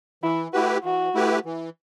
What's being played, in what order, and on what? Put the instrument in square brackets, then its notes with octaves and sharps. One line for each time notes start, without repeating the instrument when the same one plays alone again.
[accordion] E3 [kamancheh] E4
[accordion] A3 E4 G4 B4 [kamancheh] F#4
[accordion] E3 [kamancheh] F#4
[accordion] A3 E4 G4 B4
E3